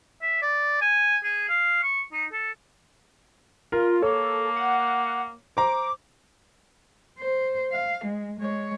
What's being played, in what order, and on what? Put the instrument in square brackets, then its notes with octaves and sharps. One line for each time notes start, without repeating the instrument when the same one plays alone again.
[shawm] E5
D5
G#5
G#4
F5
C#6
D#4
A4
[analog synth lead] F4 [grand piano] A#4
[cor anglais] A#3 [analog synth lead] A4 [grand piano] C#5
[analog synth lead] F#5
[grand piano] C5 A#5 [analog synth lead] D6
[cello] C5
F5
G#3
G#3 C#5